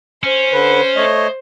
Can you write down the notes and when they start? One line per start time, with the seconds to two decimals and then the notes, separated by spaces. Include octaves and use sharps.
0.23 C#4 C5
0.52 D3 B4
0.96 A3 C#5 D#5